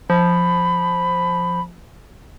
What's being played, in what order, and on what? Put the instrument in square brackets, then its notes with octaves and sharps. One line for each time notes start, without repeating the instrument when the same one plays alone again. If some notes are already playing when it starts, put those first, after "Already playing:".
[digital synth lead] F3 [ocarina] B5